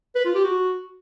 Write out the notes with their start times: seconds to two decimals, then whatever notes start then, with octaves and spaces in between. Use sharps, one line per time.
0.15 B4
0.25 F4
0.35 G4
0.44 F#4